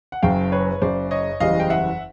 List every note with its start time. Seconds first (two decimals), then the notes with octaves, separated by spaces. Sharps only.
0.12 F#5
0.22 F#1 F#2 C#3 F5 G5
0.52 B4 C#5
0.82 F#1 F#2 C#3 C5 D5
1.11 C#5 D#5
1.40 F#1 E2 C#3 E3 G3 D#5 F5
1.60 G5
1.70 E5 F#5